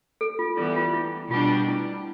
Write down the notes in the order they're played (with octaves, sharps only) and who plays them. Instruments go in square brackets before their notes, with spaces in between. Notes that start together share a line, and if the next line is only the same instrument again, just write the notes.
[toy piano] A4
F4
[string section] E3 G3 B3 [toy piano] E4
[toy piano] F4
E4
[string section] B2 G3 D4 G4 [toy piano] F4
[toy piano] E4